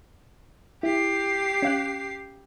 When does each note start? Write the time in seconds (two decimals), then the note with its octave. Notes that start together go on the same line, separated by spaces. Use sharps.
0.83 E4 G4 C7
1.62 C#4 F5 F#6